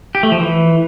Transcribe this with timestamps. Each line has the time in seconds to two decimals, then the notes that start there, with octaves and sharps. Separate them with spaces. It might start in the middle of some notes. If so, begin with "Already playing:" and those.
0.15 G4
0.23 A3
0.32 F3
0.40 E3